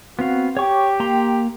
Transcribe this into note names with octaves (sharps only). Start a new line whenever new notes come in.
B3 C4 F#4 F5
G4 C#5 G5 C#6 D6
A#3 A#5 C6